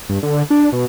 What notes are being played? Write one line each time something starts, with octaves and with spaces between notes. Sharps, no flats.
G2
D3
D4
B2